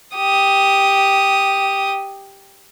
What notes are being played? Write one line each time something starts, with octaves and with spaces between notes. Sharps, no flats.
G4 D#6